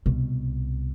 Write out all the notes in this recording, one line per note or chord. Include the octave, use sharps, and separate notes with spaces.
C2 B2